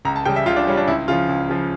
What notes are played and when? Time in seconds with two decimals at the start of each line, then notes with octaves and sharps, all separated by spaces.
0.05 C#2 A#5
0.16 A5
0.25 C#3 G3 G5
0.36 E5
0.46 C#2 F4
0.56 D4
0.67 C#3 G3 C#4
0.77 D4
0.88 C#2 E4
1.08 C#3 F3 F4
1.29 C#2
1.49 C#3 F3